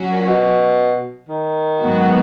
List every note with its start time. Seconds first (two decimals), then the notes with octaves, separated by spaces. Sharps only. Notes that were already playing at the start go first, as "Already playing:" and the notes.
Already playing: F#3 C#4 F#4
0.12 A#2
0.28 B2
1.29 D#3
1.79 G#2 F#3 B3 F#4